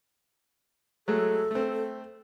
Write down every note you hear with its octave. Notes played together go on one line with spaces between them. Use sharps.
F#3 G#3 A3 A4
A3 C4